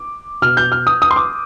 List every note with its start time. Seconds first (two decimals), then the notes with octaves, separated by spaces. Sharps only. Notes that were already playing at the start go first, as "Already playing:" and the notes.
Already playing: D6
0.42 B2 F6
0.57 G6
0.72 F6
0.87 D#6
1.02 D#6
1.11 C6
1.16 D6